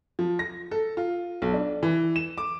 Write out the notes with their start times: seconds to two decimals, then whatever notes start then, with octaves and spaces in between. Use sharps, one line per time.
0.19 F3
0.39 A#6
0.71 A4
0.97 F4
1.42 B1
1.54 D4
1.83 E3
2.16 E7
2.38 D6